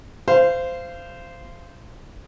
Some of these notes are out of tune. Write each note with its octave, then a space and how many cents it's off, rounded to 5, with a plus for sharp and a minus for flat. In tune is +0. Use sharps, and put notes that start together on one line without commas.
C5 -15 F5 -25